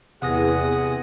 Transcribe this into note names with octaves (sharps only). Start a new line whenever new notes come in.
E2 C3 G#4 F#5 D#6 A#6